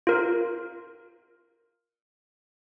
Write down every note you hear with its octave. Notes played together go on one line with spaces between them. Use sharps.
F4 A#4